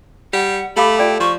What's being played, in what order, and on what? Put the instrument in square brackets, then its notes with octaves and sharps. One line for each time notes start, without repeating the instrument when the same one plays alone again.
[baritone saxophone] G3 [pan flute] F#5
[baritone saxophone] A3 [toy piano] G4 F5 D6 [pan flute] B5
[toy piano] F4 D5 D6 [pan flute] G5
[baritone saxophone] F3 [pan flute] C#6